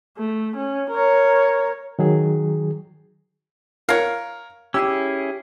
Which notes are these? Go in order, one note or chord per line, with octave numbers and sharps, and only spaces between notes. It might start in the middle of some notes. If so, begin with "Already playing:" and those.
A3
C#4
A#4 C#5
D#3 F#3 G#4
A#4 C#5 F5 F#5
C#4 E4 G4 G#4 E6